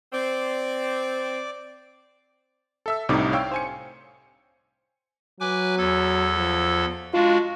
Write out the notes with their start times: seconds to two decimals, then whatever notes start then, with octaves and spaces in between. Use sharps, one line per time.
0.13 C4 D5 D6
2.86 A4 E5 E6
3.09 C2 A2 C3 D4 D#4 D6
3.32 C#5 F5 G5 E6
3.51 C5 G#5 C#7
5.40 F#3 B4 G#5 D6
5.78 E2 A4 G#6
6.37 F3
7.13 G#3 D4 F4 F#4